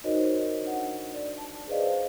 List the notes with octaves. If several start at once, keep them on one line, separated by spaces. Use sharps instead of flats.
D#4 F#4 A#4 C5 C#5 D#5
D4 F#5
D5
A5
G#4 B4 C5 D5 D#5 F5